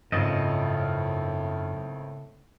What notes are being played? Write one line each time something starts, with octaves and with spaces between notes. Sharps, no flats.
G#1 F#2 A2 C#3 F4 D#5